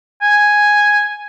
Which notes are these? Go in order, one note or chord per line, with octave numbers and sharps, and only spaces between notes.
G#5